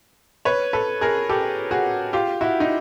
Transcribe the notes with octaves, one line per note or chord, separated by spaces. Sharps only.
B4 C#5
A4 B4
G#4 A#4
G4 A4
F#4 G#4
F4 G4
E4 F#4
D#4